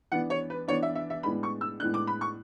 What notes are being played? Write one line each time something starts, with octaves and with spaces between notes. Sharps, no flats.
E3 B3 D4 F#5
C#5
B4
E3 B3 D4 C#5
E5
E5
E5
A2 G#3 B3 D4 B5
C#6
E6
A2 G#3 B3 D4 F#6
D6
B5
C#6